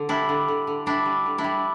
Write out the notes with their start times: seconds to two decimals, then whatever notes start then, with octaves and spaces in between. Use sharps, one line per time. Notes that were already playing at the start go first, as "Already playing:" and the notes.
Already playing: D3
0.09 G3 D4 E4
0.29 D3
0.48 D3
0.67 D3
0.86 G3 D4 E4
1.06 G3
1.26 D3
1.38 D4 E4
1.44 G3